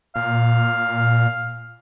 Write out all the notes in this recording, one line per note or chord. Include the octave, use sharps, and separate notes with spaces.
A#2 F5